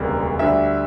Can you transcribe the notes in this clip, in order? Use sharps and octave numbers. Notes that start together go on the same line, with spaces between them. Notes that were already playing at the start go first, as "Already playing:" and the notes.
Already playing: E1 D2 C#3 G3 A#3
D2 D3 G3 E5